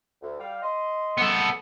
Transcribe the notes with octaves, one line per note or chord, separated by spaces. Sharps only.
D2
G3 F5 G5
D#5 C6
B3 A4